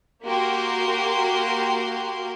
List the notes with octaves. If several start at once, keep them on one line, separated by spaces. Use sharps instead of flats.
A#3 F#4 G4 A#4 C6